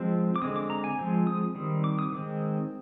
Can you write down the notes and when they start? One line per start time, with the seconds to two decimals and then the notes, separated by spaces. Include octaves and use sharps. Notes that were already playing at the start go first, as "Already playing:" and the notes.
Already playing: F3 G#3 C4
0.36 D6
0.42 D3 G#3 C4 D#6
0.56 D6
0.70 A#5
0.84 G#5
0.99 F3 G#3 C4
1.27 D#6
1.55 D#3 G3 C4
1.84 D6
1.99 D#6
2.12 D#3 G#3 C4